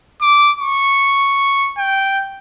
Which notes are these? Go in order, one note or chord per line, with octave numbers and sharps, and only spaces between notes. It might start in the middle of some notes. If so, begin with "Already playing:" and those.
D6
C#6
G5